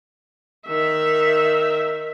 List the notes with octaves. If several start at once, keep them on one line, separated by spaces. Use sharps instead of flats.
D#3 E5